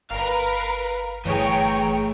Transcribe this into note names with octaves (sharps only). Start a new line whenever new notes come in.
G1 A#4 B4 F5
G1 E3 A3 G#4 B4 C#5 G5 A#5